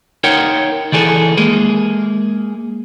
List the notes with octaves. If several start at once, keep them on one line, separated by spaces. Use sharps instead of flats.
D#4 A#4 C#5 F#5 G5
D#3 E3 G#4 A4
G#3 A#3 G#4